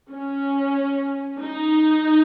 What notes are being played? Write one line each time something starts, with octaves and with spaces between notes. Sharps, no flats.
C#4
D#4